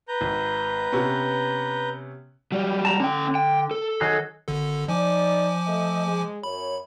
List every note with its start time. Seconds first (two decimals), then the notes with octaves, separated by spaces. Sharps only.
0.08 B4 A#5 G6
0.21 G#1
0.92 C3 B3 C#4
2.52 F#3 G3
2.85 A5 A#5
3.00 D3 C#4 G5
3.35 G5
3.71 A4
4.01 D#3 F#3 G#4
4.48 G#1 D3 A4
4.88 F3 D#4 D5 G#5 D6
5.67 A3 D#5
6.07 G#3
6.44 F#2 C#5 B5